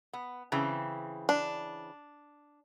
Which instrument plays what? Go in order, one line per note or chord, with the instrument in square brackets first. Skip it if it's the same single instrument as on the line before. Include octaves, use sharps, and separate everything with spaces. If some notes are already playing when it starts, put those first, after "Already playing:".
[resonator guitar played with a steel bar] B3
C#3 E3 C4
[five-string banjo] D4